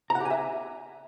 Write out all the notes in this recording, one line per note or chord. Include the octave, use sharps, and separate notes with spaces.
A#5
F#5
G4
G#5
E5